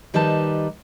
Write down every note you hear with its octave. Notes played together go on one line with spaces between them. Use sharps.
D#3 G3 D#4 B4 A5